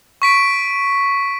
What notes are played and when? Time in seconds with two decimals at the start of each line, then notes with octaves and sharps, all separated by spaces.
0.22 C#6 B6 D7